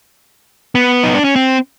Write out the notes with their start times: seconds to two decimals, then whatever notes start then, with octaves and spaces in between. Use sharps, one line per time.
0.75 B3
1.03 D#4
1.15 D4
1.24 C#4
1.36 C4